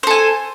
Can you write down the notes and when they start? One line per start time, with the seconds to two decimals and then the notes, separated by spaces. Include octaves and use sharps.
0.03 C5
0.07 A4
0.11 G#5